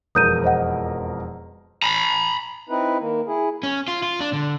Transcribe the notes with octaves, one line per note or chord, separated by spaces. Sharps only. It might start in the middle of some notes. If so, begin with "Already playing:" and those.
E1 F2 A#4 D#6 G6 D#7
C5 D#5 F#5
A#5 B5
C4 D#4 E4 B4
D#3 A#3
E4 G#4
C#4
F4
F4
D4
D3